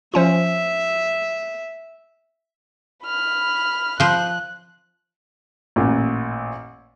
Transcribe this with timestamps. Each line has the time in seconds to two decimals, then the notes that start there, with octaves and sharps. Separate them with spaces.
0.14 F3 C#4 F4 E5
3.04 B5 F6
4.00 F3 C5 F#6
5.76 A1 A#2